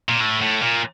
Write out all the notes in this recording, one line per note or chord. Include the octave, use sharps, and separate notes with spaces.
A#2
A2
A2
A#2